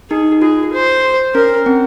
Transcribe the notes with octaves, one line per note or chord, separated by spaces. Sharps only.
D#4 G#4
F4 G#4
C5
C#4 A#4
C4